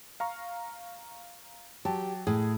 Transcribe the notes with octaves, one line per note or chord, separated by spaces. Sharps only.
F5 A#5 C#6
F#3 G4 A5
A2 G#4